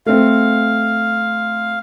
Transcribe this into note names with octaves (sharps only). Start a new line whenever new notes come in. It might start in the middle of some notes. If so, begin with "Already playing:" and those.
A3 C4 F5